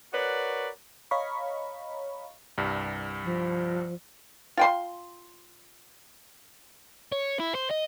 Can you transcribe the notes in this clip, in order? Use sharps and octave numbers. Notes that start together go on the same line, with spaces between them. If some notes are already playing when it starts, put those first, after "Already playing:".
F#4 A#4 B4 C#5 D5
C#5 D#5 F5 A#5 B5 C#6
C2 G2
F3
F4 G5 C6
C#5
E4
C5
D#5